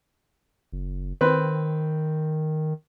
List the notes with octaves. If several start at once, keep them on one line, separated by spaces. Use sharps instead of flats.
F#1
D#3 C4 B4